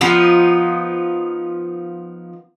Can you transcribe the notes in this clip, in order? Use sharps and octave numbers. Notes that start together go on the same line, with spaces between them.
F3 B3 D#4